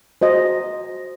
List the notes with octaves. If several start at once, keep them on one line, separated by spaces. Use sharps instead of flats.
F#4 C5 D#5